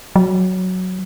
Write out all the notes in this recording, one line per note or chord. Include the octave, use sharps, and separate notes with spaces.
F#3